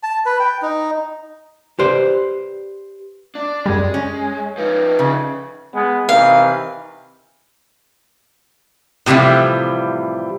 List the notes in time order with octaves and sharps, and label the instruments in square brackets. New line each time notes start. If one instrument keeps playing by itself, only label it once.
[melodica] A5
B4
G5
D#4
[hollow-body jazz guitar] G4 B4 C5 D5
[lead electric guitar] D4
[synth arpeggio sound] F#2 G3 [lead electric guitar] G#3 [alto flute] D5
[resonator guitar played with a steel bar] C#4 [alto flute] G#5
[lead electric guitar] F3 D#4 [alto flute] B4
[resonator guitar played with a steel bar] C#3
[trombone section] G#3 B3
[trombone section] C3 D#3 E3 [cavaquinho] F5
[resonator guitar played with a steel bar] A2 C3 E3 F3 G3